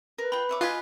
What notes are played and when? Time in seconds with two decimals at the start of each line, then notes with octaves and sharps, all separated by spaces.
0.18 A#4 B4
0.32 F4 G5 B5
0.49 C#5 E5 D6
0.61 F4 D#5 F5 G#5 F#6 B6